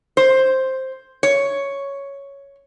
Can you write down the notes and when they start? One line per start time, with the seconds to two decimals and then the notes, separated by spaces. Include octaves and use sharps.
0.17 C5
1.23 C#5